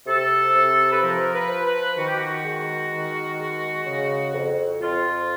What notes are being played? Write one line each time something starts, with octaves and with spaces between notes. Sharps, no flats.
C3 A4
C3
B4
F3 A#4
B4
F3
B4
D#3 F#4
G4
F#4
G#3
D#3
G#3
C#3
F2
F2 F4